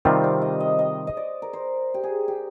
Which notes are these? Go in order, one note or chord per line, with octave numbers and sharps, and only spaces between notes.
C3 D#3 G3 C4 F4 C5
D5
D#5
D#5
D#5
D#5
D5
A#4
C5
G4
G#4
G4